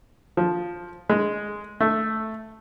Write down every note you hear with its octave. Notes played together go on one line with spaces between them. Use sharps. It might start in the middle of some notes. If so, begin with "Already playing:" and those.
F3
G#3
A3